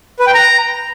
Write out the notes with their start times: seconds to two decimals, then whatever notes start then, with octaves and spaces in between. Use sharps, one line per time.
0.19 B4
0.27 G5
0.34 A#5